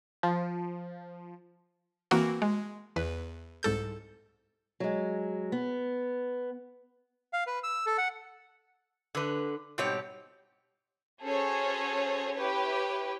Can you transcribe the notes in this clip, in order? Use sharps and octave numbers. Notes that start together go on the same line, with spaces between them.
F3
E3 A#3 C4 F#4 A#4
G#3
E2 B4
C2 G#2 A4 G6
F#3 G#3
B3
F5
B4
E6
A4
F#5
D3 B4
G#2 B2 G3 C4 G4 C#5
C#4 F#4 G#4 A4 C5 C#5
E4 G4 B4 C#5